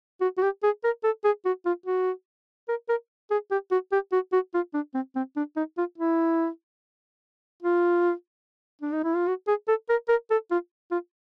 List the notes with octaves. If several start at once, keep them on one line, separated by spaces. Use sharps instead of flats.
F#4
F#4
G4
G#4
A#4
A4
G#4
F#4
F4
F#4
A#4
A#4
G#4
G4
F#4
G4
F#4
F#4
F4
D4
C4
C4
D4
D#4
F4
E4
F4
D4
D#4
E4
F4
F#4
G#4
A4
A#4
A#4
A4
F4
F4